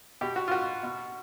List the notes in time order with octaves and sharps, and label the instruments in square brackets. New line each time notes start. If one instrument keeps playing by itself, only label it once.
[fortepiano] B2 G4
F#4
F4
F#4
B2